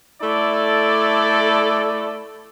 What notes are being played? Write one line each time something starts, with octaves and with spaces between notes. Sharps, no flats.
A3 E4 A4 D5